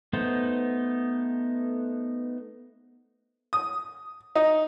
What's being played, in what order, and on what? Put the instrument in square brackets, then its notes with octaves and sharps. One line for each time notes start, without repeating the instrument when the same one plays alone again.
[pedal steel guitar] A3 B3 D#4 C5
[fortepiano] D#6
D#4